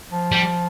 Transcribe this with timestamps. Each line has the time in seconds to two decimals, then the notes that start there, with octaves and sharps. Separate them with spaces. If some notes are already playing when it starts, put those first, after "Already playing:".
0.11 F3
0.32 G3